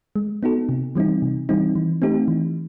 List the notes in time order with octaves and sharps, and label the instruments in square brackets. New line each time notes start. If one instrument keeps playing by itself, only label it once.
[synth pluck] G#3
B3 D#4 F#4 A4
C3
E3 G3 C4 D#4
C3
E3 G3 C4 D#4
E3
A3 C4 D#4 G4
E3